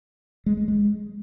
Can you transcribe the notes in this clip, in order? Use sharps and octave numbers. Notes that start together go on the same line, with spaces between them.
G#3
G#3
G#3